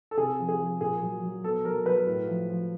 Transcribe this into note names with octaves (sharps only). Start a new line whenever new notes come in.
A4
C3 G#4
F3
G#4
F3
A#2 G#4
F#3
F#3
B2 A4
F#3 A#4
F#3 B4
A2
F3
F3